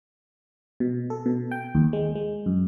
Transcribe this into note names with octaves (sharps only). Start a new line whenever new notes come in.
B2
A4
B2
G5
D#2
G#3
G#3
F#2